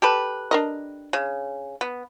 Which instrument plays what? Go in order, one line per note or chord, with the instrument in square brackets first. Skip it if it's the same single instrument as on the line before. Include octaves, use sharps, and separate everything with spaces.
[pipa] G4 A4 B4
[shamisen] D4 A#4 D#5
[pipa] C#3
B3